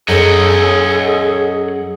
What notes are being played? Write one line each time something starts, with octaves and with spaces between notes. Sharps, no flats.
F#2 G#4 A4 C#5 D#5 F#5